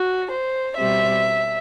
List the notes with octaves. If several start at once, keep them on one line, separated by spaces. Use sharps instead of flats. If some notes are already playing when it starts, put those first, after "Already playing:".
Already playing: F#4
C5
B2 G3 C4 E5